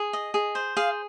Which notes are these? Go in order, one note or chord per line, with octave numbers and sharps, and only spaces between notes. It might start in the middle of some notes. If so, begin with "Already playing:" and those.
Already playing: G#4
D#5
G#4
C5
G#4 F5